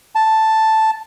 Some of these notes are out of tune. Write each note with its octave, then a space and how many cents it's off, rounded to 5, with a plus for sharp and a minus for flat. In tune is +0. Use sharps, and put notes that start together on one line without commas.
A5 +0